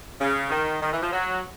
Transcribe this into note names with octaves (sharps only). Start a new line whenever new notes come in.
C#3
D#3
D#3
E3
F3
F#3